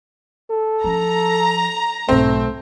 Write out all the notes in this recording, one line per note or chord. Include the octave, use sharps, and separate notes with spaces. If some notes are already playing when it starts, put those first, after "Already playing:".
A4
F3 C#4 A#5
B1 G#2 A3 C4